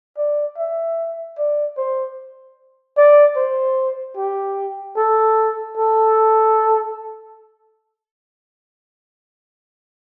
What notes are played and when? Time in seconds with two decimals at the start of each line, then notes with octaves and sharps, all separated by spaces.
0.17 D5
0.58 E5
1.38 D5
1.77 C5
2.97 D5
3.37 C5
4.17 G4
4.97 A4
5.77 A4